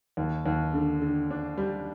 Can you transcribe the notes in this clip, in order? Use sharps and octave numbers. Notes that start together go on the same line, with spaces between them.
D#2
D#2
D3
D3
D4
G3